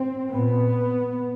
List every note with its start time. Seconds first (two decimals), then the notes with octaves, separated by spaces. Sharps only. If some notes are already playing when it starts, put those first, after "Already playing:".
Already playing: C4
0.33 A#2 B3